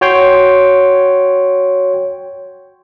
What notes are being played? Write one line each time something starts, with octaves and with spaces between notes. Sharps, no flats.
F#4 C#5 G5 C6